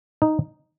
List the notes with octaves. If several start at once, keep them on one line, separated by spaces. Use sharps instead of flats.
D#4